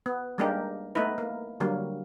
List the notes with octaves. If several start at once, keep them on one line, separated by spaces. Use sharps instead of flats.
B3
G3 G#3 A#3 D4 D#4 G4
A3 B3 D#4 E4 B4
A#3
D3 F#3 G3 A#3